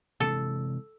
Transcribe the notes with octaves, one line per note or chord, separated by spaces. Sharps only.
C3 E3 G#3 A4